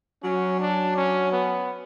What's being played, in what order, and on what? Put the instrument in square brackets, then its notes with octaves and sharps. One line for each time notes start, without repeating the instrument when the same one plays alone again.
[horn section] F#3 [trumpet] C#4
[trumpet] D4
C#4
B3